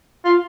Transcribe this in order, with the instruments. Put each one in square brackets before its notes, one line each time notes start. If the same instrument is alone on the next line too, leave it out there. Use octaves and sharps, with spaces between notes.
[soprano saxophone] F4